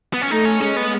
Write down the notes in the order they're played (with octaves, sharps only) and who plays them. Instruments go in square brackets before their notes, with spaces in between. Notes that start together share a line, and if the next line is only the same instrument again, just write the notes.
[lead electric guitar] B3
C#4
[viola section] A3 [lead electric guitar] D#4
[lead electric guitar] C#4
[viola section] G#3 [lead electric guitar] C#4
[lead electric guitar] B3